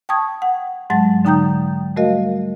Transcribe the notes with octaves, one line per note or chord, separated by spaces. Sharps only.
G5 A5 C#6 D#6 G#6
F#5
G#2 F#3 G#3 F#5 A5 A6
D3 D#4 G5 A#5 D#6 G6
G3 A3 F#4 A#4 D#5 F5